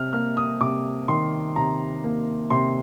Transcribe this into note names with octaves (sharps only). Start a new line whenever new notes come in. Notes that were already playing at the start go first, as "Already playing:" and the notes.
Already playing: C3 F6
A#3 F6
D#6
C3 D6
D#3 C6
C3 A#5
A#3
C3 C6